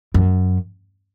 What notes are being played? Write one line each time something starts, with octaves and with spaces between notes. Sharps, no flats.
F#2